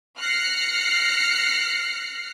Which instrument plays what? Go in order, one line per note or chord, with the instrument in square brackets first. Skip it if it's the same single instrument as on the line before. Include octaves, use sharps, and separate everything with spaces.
[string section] F6 F#6 A#6 C7 C#7